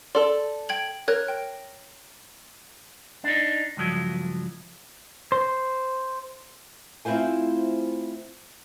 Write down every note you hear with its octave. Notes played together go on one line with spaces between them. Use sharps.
A4 D5 C6
G5 G#6 F#7
A#4 C#5 F#6 G#6
G5
D4 D#4
C#2 G2 F3 F#3
C5
A3 C4 E4 F4 C5 G#5